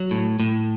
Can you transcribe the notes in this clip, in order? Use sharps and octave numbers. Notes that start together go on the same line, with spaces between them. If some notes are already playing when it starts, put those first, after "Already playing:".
Already playing: F#3
A2
A2